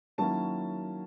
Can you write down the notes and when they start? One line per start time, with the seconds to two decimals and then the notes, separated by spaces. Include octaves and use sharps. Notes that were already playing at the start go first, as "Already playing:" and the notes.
0.18 D#3 F#3 A#3 C#4 E4 A5